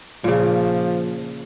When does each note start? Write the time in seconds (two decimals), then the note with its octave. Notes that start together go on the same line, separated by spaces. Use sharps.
0.24 A#2 C#3 F3